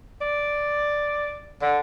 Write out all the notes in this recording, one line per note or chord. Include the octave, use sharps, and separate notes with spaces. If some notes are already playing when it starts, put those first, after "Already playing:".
D5
D3